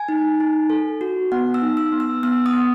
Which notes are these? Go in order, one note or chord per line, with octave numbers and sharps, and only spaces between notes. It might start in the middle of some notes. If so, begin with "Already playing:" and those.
Already playing: G#5
D#4
D#4
A4
F#4
B3 F#5
E6
D#4
E6
B3
E6
B3 E6
D#6
B3